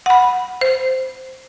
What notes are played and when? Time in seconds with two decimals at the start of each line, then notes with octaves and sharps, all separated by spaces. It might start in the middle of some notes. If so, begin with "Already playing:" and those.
0.06 F#5 B5
0.61 C5